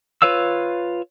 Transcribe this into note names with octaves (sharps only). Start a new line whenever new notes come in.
F4 B4 C#5 F5 E6